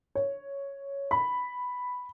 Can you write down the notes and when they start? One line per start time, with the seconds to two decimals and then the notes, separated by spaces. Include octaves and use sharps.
0.15 C#5
1.11 B5